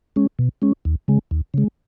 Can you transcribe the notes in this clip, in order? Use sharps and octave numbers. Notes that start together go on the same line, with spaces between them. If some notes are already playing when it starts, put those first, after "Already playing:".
G#3 C#4
B2
G#3 C#4
D#2
C#3 G#3
D#2
C#3 G#3